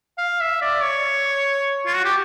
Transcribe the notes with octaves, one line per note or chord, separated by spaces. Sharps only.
F5
E5
D5
C#5
F4
F#4
G4